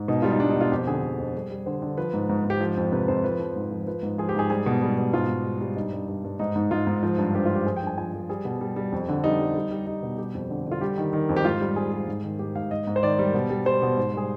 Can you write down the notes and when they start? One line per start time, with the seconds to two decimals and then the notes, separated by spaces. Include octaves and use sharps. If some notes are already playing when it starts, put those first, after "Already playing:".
Already playing: G#2
0.08 B2 D#4
0.22 G3 F4
0.31 D#4
0.40 G3 D4
0.50 D#4
0.55 B2
0.61 F4
0.72 F2 G4
0.87 D3 G#4
1.03 D3
1.19 F2
1.35 G3
1.51 G3
1.66 D3 C5
1.82 D3
1.98 F3 B4
2.13 G#2
2.29 G#2
2.45 G#2
2.50 G4
2.61 F3
2.77 F2
2.92 C3 B4
3.08 F2 C5
3.24 F3 B4
3.40 F3
3.56 G#2
3.71 F3
3.87 F3 B4
4.03 G#2
4.18 F3 G#4
4.29 G4
4.34 G#2 G#4
4.50 G3 G#4
4.66 B2
4.82 G3
4.98 B2
5.13 G#2 F4
5.29 G#2
5.45 G3
5.60 G3
5.76 G2 D#4
5.93 G2
6.08 G2
6.24 G2
6.39 G#2 D#4
6.55 G#2
6.71 G#2 F4
6.87 G#2
7.03 F3
7.18 G2
7.34 G2 G4
7.45 F4
7.50 F3
7.55 G4
7.66 F3 G#4
7.76 G5
7.82 G2
7.87 G#5
7.97 F3 G#5
8.13 F3
8.29 G3 G#4
8.45 B2
8.61 G3
8.76 G3
8.92 F2
9.09 D3
9.24 G3 D#4
9.39 G3
9.55 G3
9.71 G3
9.86 G3 D#4
10.02 B2
10.18 G3 G4
10.34 F2
10.50 D3
10.66 D3
10.72 F4
10.81 G3 G4
10.97 D#3
11.13 D#3
11.29 F2
11.37 G4
11.45 G#2 F4
11.61 G3
11.76 G3 G#4
11.92 G3
12.07 G#2
12.24 D#3
12.39 G#2 G4
12.55 G#2 F5
12.71 G#2 D#5
12.87 G#2
12.96 C5
13.03 D#3 D5
13.19 G3
13.34 B2
13.50 G3
13.65 G3 C5
13.82 B2
13.97 G#2
14.13 G3 G#4